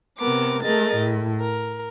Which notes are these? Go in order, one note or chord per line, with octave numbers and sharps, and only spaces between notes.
C3 B3 A#4 D6
A3 G#4 A#4 D#5 A6
A2
A#4